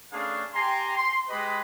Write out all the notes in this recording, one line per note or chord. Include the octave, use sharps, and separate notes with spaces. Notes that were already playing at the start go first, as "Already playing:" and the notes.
A3 C#4 D4 G#4 B4 F5
G4 G5 G#5 A#5 C6
C6
G#3 G4 B4 D#5 B5